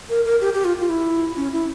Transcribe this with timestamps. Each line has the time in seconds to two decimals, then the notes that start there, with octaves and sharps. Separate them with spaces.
0.09 A#4
0.25 A#4
0.41 G4
0.54 G4
0.64 F4
0.80 F4
0.89 E4
1.36 C#4
1.53 E4